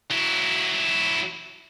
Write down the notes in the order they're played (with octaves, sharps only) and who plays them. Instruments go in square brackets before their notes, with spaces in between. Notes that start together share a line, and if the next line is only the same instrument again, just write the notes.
[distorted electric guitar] F#3 E4